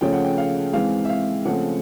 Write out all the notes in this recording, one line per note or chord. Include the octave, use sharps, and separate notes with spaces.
C#3 F3 A3 C#4 G5
F#5
G5
F5
G#2 E3 G#3 C4 F5
E5
F5
C#3 F3 A3 C4 F#5